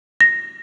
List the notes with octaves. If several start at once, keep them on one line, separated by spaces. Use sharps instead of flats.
A#6